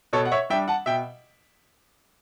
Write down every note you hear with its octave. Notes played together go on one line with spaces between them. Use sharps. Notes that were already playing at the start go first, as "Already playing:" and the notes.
B2 A4 C#5
F#5
C#5 E5
G3 D4 E5 G5
F#5 A5
B2 E5 G5